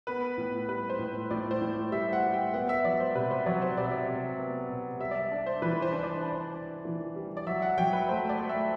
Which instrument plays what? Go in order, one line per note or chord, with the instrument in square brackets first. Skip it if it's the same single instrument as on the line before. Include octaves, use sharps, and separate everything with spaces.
[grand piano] B3 [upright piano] B4
[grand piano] A2
[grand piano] G3 [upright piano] B4
[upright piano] C5
[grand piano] A2
[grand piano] A2 [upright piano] D5
[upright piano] C5
[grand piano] A2
[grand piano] G3 [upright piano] E5
[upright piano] F#5
[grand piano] G3
[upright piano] G5
[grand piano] B3 [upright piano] F#5
[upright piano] E5
E5
[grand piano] F#3 [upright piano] D5
[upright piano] C5
[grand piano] C3 [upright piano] B4
[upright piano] C5
[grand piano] F#3 [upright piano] D5
[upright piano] C5
[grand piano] C3 [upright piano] D5
[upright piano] E5
D5
[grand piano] C3
B3
C3
[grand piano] G3 [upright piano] E5
[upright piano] D5
E5
[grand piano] D4
[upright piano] C5
[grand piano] E3 [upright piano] B4
[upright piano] C5
[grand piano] D4
[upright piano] D5
[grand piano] D4
D4
E3
G3
[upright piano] D5
[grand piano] F#3 [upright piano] E5
[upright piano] F#5
[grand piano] F#3 [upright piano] G5
[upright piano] B4
[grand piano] A3 [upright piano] C5
[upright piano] D5
[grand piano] A3
[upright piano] E5